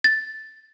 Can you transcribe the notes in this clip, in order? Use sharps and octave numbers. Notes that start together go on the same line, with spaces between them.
A6